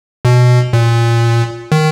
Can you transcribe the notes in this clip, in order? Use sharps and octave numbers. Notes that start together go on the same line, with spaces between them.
B2
A#2
D#3